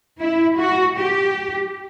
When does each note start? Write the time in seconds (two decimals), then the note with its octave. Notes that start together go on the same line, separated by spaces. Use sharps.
0.20 E4
0.58 F#4
0.97 G4